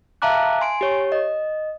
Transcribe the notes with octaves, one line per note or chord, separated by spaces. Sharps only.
E5 F5 A5 A#5 D6 F#6
G#5 C6 D7
G4 C#5
D#5